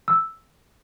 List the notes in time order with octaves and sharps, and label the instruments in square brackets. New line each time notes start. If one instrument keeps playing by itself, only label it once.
[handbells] E6